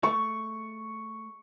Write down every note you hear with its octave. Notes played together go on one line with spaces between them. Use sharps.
A3 C#6